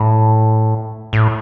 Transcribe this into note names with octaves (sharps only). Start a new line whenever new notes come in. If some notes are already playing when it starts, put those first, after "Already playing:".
Already playing: A2
A2